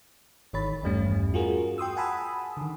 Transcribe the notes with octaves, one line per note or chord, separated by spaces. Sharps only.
G#1 D#3 C#5 B5 A6
E2 G2 G3 A3 C#4
F4 F#4 G#4 A#4
G5 C6 D#6 E6
F#5 G#5 A5 B5 D#6 E6
D3 D#3